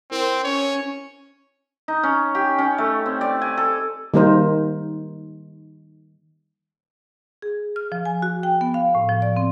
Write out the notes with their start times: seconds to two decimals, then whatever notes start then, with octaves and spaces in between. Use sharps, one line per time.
0.11 C4 E4 A#4 C5
0.44 C#4 C#5
1.88 D#4
2.03 C#4
2.35 G4
2.58 C#4
2.78 A3
3.06 C4
3.21 D5
3.42 G#5
3.58 A4
4.14 D#3 G3 A#3 D#4 A#4 C5
7.42 G#4
7.76 F6
7.92 F3
8.05 G#5
8.22 F#4
8.43 G5
8.61 B3
8.74 F5
8.95 A2
9.09 F3
9.22 D5
9.36 C4